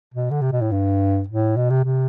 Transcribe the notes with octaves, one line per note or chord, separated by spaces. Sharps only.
B2
D3
C3
B2
A2
G2
A2
B2
C3
C3